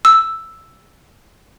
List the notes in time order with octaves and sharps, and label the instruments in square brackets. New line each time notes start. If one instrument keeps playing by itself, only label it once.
[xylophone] E6